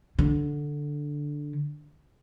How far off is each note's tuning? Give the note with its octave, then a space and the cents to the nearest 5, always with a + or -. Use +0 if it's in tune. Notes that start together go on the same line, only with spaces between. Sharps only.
D3 +0